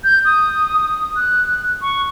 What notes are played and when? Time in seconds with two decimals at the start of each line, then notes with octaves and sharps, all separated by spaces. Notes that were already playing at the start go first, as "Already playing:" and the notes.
0.04 G6
0.25 D#6
1.16 F#6
1.82 C#6